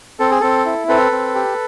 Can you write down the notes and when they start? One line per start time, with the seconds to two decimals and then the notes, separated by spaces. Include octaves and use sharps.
0.19 C4 A4
0.31 G#4
0.41 C4 A4
0.65 E4
0.88 C4 A4 B4
1.11 C4
1.35 G4